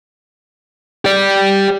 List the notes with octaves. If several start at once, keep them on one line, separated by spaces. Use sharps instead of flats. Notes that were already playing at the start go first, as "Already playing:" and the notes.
G4 D5